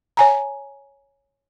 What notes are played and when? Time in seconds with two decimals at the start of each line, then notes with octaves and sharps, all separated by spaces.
0.17 C#5 G#5 A#5